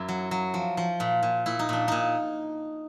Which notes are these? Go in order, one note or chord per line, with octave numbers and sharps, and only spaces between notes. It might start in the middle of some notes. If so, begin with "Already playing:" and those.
Already playing: F#2 E4
F#3
F#3
F3
F3
A#2
A#2
A#2 E4
D#4
A#2 D4
A#2 D#4